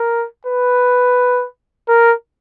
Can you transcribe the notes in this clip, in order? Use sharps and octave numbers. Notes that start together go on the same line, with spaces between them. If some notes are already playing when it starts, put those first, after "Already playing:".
Already playing: A#4
B4
A#4